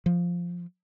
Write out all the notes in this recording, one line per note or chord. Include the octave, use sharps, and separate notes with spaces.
F3